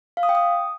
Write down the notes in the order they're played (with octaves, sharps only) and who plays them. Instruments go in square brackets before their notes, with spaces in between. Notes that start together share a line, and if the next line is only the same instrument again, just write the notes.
[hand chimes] F5
D#6
G5
D#6